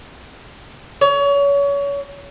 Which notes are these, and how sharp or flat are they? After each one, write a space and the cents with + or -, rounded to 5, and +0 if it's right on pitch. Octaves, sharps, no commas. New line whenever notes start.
C#5 +30